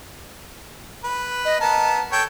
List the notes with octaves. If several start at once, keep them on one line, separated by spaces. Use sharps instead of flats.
B4
D#5
B3 A#4 A5
A4 C#5 G5